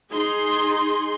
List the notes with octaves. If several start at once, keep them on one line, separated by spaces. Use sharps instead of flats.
D#4 G#4 C6